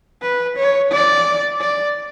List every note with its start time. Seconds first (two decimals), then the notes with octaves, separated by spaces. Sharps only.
0.22 B4
0.57 C#5
0.92 D5
1.61 D5